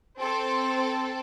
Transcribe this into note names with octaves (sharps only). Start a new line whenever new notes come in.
C4 A4 C6